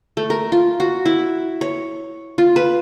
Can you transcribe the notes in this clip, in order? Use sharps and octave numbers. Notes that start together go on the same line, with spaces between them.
A3
A#4
F4
F#4
E4
C#5
F4
B4